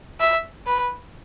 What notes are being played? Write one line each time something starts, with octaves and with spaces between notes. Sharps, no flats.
E5
B4